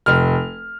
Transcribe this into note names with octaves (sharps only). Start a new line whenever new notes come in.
F1 F6